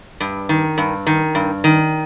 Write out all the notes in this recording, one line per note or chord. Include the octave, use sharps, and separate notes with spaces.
G2
D#3
G2
D#3
G2
D#3